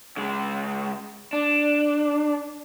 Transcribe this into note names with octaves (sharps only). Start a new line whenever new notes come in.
C#2 G#3
D4